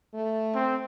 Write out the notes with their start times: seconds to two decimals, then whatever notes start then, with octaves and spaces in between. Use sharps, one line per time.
0.14 A3
0.55 C4